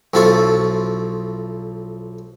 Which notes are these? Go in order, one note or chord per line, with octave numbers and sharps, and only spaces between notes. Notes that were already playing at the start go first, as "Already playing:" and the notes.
B1 F3 E4 F4 A4 C#6